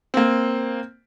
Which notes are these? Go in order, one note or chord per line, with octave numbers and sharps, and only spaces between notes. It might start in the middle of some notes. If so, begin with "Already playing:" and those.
A#3 C4